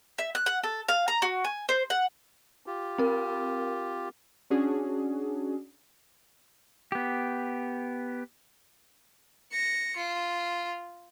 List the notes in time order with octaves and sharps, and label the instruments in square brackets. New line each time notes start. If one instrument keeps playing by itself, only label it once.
[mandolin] E5
F#6
F#5
A4
F5
A#5
F#4
G#5
C5
F#5
[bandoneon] F4 G4
[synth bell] C4 A#4
[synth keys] C#4 D4 F#4 G#4
[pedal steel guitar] B3 G4
[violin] A#6 C#7
F4